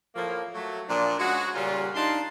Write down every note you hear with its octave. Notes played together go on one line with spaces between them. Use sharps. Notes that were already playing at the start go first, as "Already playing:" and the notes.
A2 F3 A#3
F#3 A3
A#2 F3 D4
G#3 C#4 F#4
A#2 C#3 G3 C#4 F4
D4 D#4 F4 A5 C6